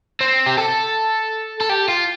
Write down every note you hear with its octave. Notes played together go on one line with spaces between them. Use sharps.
C4
G4
A4
A4
G4
F4